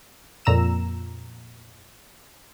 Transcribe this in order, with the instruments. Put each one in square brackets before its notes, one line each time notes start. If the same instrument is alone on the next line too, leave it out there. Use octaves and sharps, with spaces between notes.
[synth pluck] F2 A#2 A#5 E6 E7